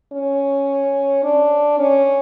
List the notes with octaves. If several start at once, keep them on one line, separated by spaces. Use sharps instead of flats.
C#4
D4
C#4